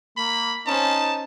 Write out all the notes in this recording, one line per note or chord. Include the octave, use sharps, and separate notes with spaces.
A#3 B5
C#4 D#4 C5 A5